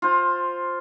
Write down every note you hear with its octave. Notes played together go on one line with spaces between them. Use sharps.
F4 C5